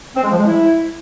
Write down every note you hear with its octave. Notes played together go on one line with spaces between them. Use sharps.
C4
G#3
F3
G#3
E4